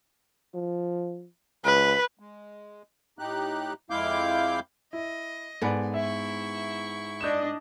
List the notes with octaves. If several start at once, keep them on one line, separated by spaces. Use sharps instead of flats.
F3
C#2 B4
G#3
A2 D#4 G4 F#6
F2 G#3 E4 F5 D6 G6
E4 D#5
G#2 B3 A4 B4 D5
E4 E5 C#6
D4 D#5 G6 E7